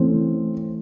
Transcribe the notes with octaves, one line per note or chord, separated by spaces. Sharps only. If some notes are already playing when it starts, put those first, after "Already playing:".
Already playing: E3 A3 C4 C#4 C5